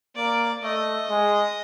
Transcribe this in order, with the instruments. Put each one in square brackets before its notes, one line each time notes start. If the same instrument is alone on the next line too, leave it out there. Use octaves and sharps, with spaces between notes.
[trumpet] A#3 [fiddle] D5
[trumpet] A3 [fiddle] D#5
[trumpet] G#3